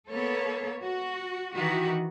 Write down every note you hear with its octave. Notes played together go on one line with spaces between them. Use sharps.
A#3 B3 A4 C#5
F#4
D#3 E3 F#4 G4